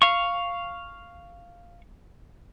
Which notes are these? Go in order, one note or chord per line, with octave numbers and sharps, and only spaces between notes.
F5 C#6